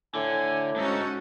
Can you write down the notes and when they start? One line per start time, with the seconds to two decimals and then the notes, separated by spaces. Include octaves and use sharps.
0.15 A2 D3 G#5
0.76 G#2 G#3 C#4 D#4 F#4 A4